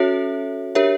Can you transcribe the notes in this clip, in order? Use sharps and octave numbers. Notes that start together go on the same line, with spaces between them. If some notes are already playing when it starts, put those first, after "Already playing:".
Already playing: C#4 F#4 A4 C#5 E5
D4 G4 A#4 C#5 E5